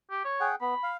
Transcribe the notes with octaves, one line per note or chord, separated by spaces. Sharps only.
G4
C#5
G#4 F#5 G5
B3 B5
F5